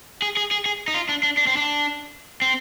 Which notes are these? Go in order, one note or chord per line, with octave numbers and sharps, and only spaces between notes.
G#4
G#4
G#4
G#4
D#4
F4
D4
D4
D4
C4
D4
C4